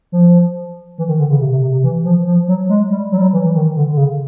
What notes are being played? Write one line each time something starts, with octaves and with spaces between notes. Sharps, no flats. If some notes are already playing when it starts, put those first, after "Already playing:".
F3
E3
D#3
D3
C#3
C3
C3
C3
C3
E3
F3
F3
F#3
G#3
G3
F#3
G3
F#3
E3
E3
D#3
D3
D3
C#3